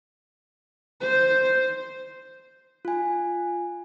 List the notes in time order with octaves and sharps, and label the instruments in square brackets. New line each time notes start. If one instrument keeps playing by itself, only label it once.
[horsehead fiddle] C5
[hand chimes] F4 G#5